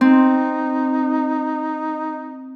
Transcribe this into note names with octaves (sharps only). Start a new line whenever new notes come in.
C4 D#4